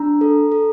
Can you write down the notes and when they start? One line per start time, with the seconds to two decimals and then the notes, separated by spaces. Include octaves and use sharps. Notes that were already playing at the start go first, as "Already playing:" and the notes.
Already playing: D4 A#5
0.21 A4
0.52 A4